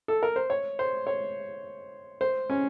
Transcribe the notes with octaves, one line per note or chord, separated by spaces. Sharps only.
A4
A#4
C5
C#5
C5
C#5
C5
C#4